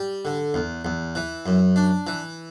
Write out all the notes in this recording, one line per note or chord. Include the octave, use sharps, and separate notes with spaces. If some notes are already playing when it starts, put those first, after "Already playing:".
Already playing: G3
D3
E2
E2
E3
F#2
D4
E3